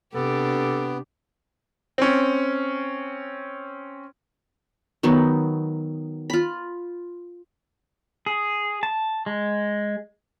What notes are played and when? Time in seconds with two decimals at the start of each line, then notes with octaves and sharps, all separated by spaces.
0.14 C3 B3 D4 G4 A4
1.98 C4 C#4
5.03 D#3 F#3 B3 D#4
6.30 F4 B5
8.26 G#4
8.83 A5
9.26 G#3